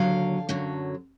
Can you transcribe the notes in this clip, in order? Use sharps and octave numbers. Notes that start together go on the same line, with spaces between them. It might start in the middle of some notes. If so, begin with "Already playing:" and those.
Already playing: D#2 D3 F#3 F5
F#2 D3 F#3